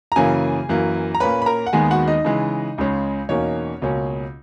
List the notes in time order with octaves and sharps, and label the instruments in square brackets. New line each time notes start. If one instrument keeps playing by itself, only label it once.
[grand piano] A#5
F#2 C#3 E3 A#3 C#4 G#4 G#5
F#2 E3 A#3
A#5
A#2 A#3 C#4 B4 B5
B5
A#4 A#5
F#5
D#2 D#3 G#3 B3 G#4 G#5
F#4 F#5
D#4 D#5
C#3 E3 G#3
C#2 C#3 G#3 C#4
E2 B2 A#3 C#4 D#4 C#5
C#2 B2 A#3 C#4